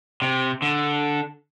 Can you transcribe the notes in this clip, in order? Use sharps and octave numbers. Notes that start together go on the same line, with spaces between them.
C3
D3